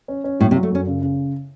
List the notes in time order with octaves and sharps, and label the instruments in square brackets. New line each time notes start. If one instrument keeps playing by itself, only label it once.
[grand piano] C#4
C#4
[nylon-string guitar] A2 [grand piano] F#3
[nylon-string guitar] C3
[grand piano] F#3
[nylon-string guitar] A3
[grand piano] F#2 [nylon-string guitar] C#4
[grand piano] C#3
C#3